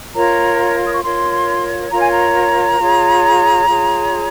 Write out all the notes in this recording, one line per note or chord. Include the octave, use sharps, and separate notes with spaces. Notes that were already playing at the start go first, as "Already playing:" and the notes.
F4 A#4 C#5 A#5
D#6
C#6
F4 A#4 C#5 C6
F4 A#4 C#5 A#5
G#5
A#5
F4 G#4 C#5
F4 G#4 C#5